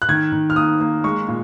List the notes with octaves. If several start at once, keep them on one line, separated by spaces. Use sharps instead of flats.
F#6
D#3 G#6
D#3
F6
A#3 D#6
A#3
G#3 C#6
A#2